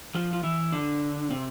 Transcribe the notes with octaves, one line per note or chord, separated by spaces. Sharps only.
F3 F4
F4
E3 E4
D3 D4
C3 C4